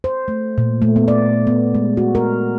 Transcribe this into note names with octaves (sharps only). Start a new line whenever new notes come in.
C5
A3
A#2
A3
B3
D5
B3
G#3
F#4
A#4